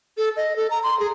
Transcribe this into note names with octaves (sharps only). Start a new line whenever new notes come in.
A4
D#5
A4
A#5
C6
G#4